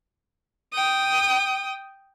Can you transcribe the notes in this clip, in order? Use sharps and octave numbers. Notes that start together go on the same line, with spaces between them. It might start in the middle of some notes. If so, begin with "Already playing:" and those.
G5 D#6